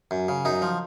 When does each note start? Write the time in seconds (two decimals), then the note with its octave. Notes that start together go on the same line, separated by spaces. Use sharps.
0.11 F#2
0.29 C#3
0.45 F#2 D#4
0.62 F3